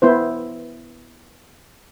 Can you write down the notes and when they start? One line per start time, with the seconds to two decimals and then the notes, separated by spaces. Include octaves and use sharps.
0.02 B3 E4 C5